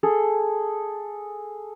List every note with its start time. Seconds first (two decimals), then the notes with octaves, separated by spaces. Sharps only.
0.03 G#4 A4